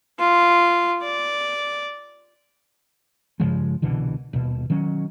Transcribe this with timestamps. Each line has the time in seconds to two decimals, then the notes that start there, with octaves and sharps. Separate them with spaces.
0.19 F4
1.02 D5
3.40 G2 C#3 F3 G#3
3.82 C2 B2 D3 E3
4.33 D#1 B2
4.70 D#3 F#3 C#4